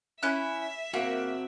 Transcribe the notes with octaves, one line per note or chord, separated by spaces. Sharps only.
C#4 E4 E5 F#6
A#3 C4 F#4 F#6